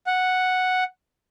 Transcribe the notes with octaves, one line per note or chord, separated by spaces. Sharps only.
F#5